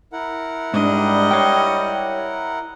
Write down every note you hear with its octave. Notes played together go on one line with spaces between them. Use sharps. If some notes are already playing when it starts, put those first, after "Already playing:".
E4 A#4 F#5
G#2 G3 D4 D#5
C#5 G5